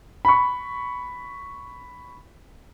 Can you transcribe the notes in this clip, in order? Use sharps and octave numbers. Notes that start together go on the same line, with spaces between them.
B5 C#6